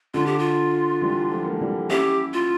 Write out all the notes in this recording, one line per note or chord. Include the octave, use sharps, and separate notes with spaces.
D3 F4
G4
F4
E3 G3
F3 A3
A#3
A3
E3 G3
C#4 E4 G4
F4